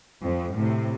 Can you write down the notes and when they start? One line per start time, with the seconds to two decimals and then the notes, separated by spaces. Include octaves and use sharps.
0.23 F2
0.55 A2 C3